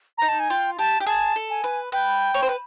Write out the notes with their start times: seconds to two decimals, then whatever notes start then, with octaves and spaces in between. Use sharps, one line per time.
0.18 D#4 A#5
0.28 A5
0.40 G#5
0.50 F4 G5
0.79 G4 A5
1.00 G4
1.07 G#4 A5
1.36 A4
1.50 G#5
1.64 B4
1.92 B4 G5
2.34 C#5
2.43 C5
2.49 B4